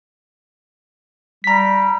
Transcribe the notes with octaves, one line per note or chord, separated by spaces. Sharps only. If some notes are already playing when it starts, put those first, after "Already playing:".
G3 A#5 B6